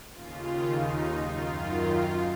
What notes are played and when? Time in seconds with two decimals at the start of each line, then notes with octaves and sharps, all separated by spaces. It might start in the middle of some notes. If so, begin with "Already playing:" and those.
0.12 D#2 C#3 F4
0.64 D#4
1.15 D#3 F4
1.20 F#2